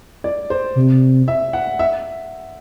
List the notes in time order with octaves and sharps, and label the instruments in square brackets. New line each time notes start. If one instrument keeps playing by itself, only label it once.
[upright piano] D5
C5
[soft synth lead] C3
[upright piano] E5
F#5
E5